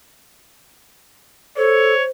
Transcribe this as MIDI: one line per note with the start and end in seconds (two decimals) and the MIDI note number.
1.57 1.93 69
1.57 2.10 72
1.57 2.03 73